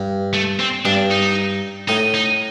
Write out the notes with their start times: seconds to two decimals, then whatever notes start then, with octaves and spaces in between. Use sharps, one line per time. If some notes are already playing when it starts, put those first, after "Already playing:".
Already playing: G2
0.33 A3
0.59 C4
0.85 G2 D4
1.11 D#4
1.88 A2 D#4
2.14 D#4